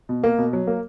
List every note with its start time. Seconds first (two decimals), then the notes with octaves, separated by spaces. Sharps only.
0.09 B2
0.24 A#3
0.38 B2
0.53 F#3
0.67 A#3